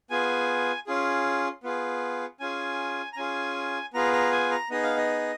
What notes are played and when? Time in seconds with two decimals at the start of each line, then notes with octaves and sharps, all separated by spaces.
0.10 B3 F4 G#4 G#5
0.87 C#4 F4 G#4
1.64 B3 F4 G#4
2.40 C#4 F4 G#4 G#5
3.13 A#5
3.17 C#4 F4 G#4 G#5
3.94 B3 F4 G#4 A#5
4.13 A#5
4.32 G#5
4.51 A#5
4.70 B3 D#4 G#4 D#5
4.83 F5
4.97 D#5